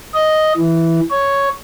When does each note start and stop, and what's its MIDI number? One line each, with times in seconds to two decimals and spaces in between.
0.14 0.53 75
0.57 1.00 52
1.11 1.49 73